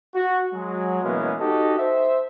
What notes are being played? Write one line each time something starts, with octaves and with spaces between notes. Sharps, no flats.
F#4
F#3 G#3
B2 E3 G#3 A#3 B3 C#4
D#4 F#4 G4 A4 D#5
C5 E5